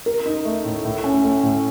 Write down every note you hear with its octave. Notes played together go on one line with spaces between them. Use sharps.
A#4
D#4
A3
A2
A2
C#4
A3
A2